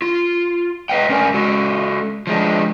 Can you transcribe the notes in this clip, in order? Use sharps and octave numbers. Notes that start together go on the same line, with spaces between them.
F4
B4 D#5 F5 G5
G2 C#4 A#4 D5 G#5
G#3 F#4 A4
F3 G#3 D4